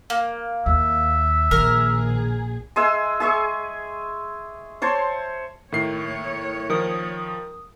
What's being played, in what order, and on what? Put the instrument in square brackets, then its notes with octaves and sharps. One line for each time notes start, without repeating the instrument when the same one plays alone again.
[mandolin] A#3
[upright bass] D#2 [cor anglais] E5
[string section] A#1 G#4 [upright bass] D#3 [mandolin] A#4
[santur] G#3 G#4 E5 E6
G#4 E5 C#6
C5 C#5 A5 C6
[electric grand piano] A2 D#3 C7 [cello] C#5
[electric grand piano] D#3 F3 [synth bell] A#4 D#6